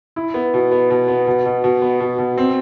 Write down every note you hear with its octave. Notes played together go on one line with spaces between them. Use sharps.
E4
B3
B2
B3
B2
B3
B2
B2
B2
B3
B2
B2
C4